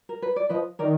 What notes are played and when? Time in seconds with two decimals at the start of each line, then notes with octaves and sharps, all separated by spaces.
0.09 A#4
0.22 B4
0.36 D5
0.49 F3 B4 D#5
0.79 D#3 A#4 D5